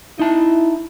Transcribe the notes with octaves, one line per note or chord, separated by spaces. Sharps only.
D#4 E4 A5